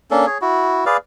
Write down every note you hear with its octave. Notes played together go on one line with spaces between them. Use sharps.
A#3 C#4 D4 A4
G#4 C#5
E4 F#4
G#4 B4 D5 F5